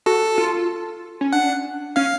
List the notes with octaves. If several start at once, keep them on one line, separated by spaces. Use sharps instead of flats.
F#4 A4
F4
C#4
D4 F#5
C#4 F5